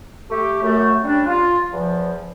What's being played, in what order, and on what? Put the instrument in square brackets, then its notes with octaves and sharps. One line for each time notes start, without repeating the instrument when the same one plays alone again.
[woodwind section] A3 G4
F#2 A3
G3 C#4 D4
F4
E2 F3